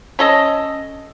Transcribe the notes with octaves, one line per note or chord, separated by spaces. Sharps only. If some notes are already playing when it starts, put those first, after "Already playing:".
C#4 A4 D#5